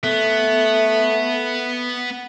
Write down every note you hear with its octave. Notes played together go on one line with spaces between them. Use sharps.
A3 B3